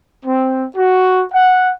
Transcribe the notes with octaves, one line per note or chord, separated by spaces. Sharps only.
C4
F#4
F#5